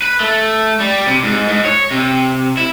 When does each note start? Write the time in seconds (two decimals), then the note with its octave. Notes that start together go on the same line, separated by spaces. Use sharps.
0.02 B4
0.20 A3
0.80 G3
1.07 C3
1.24 G#2
1.48 G#2
1.65 C#5
1.91 C3
2.57 E4